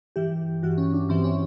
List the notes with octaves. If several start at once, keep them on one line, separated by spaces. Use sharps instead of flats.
G2 E3 G4
G2 E3 F#4
C#4
D4
G2 E3 C4
C#4